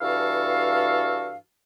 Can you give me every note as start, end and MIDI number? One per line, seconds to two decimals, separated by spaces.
0.01 1.35 43
0.01 1.35 52
0.01 1.35 66
0.01 1.35 69
0.01 1.35 77